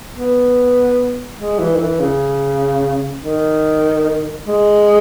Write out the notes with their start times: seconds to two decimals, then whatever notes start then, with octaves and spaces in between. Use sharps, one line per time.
0.15 B3
1.38 G#3
1.59 E3
1.75 D#3
1.79 E3
1.99 C#3
3.23 D#3
4.46 G#3